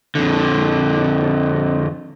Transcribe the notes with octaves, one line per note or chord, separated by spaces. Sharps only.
F2 D3